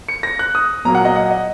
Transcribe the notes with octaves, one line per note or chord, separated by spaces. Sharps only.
C#7
A#6
F#6
D#6
A#2 F#3 A#3 A#5
F#5
D#5
F#5
D#5